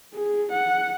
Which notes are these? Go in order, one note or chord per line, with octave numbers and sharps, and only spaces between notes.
G#4
F#5